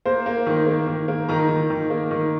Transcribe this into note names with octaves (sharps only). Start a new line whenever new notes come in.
A#3 C5
A#3
D#3
A#3
D#3
A#3
D#3 A#5
D#3
D#3
A#3
D#3